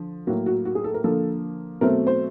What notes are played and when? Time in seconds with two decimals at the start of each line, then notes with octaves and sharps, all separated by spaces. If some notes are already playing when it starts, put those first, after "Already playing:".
Already playing: D3 F3
0.27 A2 F#3 A#3 F#4
0.46 F#4
0.65 F#4
0.75 G#4
0.84 A4
0.94 A#4
1.04 D3 F3 A#3 A4
1.81 B2 F#3 A3 C4 A#4
2.07 C5